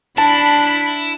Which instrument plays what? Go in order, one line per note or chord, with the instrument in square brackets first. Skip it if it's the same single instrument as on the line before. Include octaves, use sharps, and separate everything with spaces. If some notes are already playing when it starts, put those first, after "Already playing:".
[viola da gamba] D4 [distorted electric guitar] E4 [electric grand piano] A5 [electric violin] B5